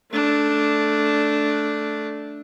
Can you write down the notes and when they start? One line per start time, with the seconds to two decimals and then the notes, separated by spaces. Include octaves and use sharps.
0.11 A3 D4